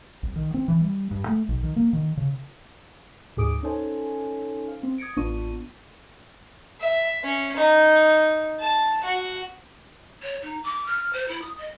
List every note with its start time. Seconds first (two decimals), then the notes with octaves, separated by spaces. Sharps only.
0.23 C2
0.36 D#3
0.54 C4
0.68 E3
0.81 G3
1.11 G2
1.28 A3
1.49 B1
1.63 D#3
1.76 A#3
1.93 D#3
2.17 C#3
3.37 D2 G#2 G#4 D6 D#6 D7
3.63 C#4 D#4 A4 C5 C#5 G#5
4.68 F5
4.83 C4
4.98 D#6 G#6 A#6 C#7 D7
5.16 A1 B3 D4 F4 C#6 D#7
6.80 E5
7.24 C#4
7.57 D#4
8.60 A5
9.04 F#4
10.23 C#5
10.42 D#4
10.64 D6
10.86 F6
11.13 C5
11.28 E4
11.42 D#6
11.58 D#5